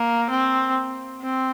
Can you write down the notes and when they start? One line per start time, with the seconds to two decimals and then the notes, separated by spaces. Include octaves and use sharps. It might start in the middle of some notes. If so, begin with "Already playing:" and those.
Already playing: A#3
0.30 C4
1.23 C4